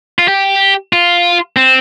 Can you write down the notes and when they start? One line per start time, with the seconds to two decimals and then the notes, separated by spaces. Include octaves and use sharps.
0.19 F4
0.28 G4
0.93 F4
1.57 C4